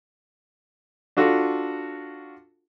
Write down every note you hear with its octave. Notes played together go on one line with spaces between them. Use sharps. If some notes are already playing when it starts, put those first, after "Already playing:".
D4 F4 F#4 A4